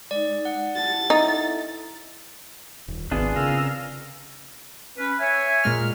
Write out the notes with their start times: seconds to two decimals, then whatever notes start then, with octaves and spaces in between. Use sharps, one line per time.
0.11 G#3 D#4 D5
0.45 F#5
0.76 E4 G4 A5 A6
1.10 D#4 E4 A4 E5
2.88 D#1
3.11 G#1 C3 B3 D4 F4 G#4
3.36 C#3 A#4 F5 E6
4.97 C#4 B4
5.19 C#5 E5 G#5
5.64 A#2 G#3 F6